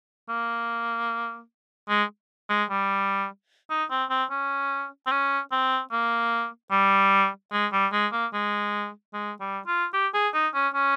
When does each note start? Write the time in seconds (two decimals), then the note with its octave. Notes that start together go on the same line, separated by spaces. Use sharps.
0.29 A#3
1.89 G#3
2.50 G#3
2.70 G3
3.70 D#4
3.91 C4
4.10 C4
4.31 C#4
5.07 C4
5.12 C#4
5.52 C4
5.92 A#3
6.71 G3
7.53 G#3
7.73 G3
7.93 G#3
8.12 A#3
8.33 G#3
9.13 G#3
9.40 G3
9.67 F4
9.93 G4
10.14 G#4
10.34 D#4
10.54 C#4
10.74 C#4